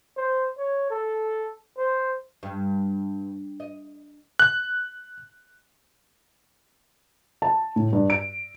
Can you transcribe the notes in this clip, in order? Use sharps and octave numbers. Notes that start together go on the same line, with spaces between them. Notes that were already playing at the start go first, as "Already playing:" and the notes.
C5
C#5
A4
C5
G2
D#5
F#6
A5
A2
G2
D7